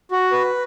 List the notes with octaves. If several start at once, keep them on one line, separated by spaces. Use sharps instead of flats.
F#4
B4